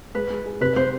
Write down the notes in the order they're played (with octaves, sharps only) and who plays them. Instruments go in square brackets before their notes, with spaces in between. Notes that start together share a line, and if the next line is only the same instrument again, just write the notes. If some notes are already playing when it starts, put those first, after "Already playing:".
[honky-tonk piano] G#3 [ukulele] B4
[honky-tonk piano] G#3
G#4
[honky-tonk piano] C3 [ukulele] B4
[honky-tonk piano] C4 [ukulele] C5